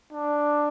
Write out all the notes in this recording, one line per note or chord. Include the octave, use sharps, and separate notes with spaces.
D4